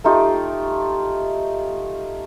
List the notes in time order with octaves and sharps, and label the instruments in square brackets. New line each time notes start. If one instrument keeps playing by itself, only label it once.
[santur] A3 D#4 F4 G4